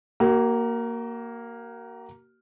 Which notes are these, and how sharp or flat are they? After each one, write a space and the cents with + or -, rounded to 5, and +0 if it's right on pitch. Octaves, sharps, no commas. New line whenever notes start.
A#3 +0 F#4 +40